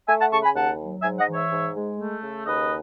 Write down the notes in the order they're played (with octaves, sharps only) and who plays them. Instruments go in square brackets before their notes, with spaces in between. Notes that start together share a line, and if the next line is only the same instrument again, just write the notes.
[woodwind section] A3 E5 G#5
F#5 A5
C#3 A5 C#6
G#5 B5
D#2 F#5 A5
F#3
G#2 E5 G#5
D#5 F#5
E3
C#5 E5
G#2
G#3
A3
C#3
D#2 B4 D#5